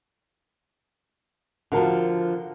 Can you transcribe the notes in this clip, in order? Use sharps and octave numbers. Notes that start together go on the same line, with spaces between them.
D3 F3 F#4 A#4 A5